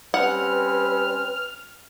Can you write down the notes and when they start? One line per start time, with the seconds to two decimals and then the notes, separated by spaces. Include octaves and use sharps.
0.14 G3 C4 C#4 B4 F#5 F6